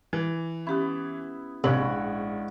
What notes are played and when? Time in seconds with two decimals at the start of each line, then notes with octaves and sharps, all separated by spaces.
0.13 E3
0.67 B3 C#4 E4 G4
1.64 A#1 G#2 C3 C#5 D5 F#5 B5 F#7